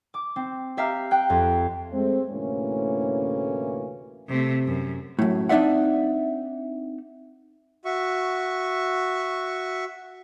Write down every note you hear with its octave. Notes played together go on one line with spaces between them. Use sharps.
D6
C4
G4 E5 F5 A#5 F6
G5 F#6
F2
G#3 A3 C4
D2 A2 C3 E3 A#3 C#4
C3 A3
F#2
F#2 A2
C4 D4 D#4 D5 E5 F#5
F#4 E5 C#6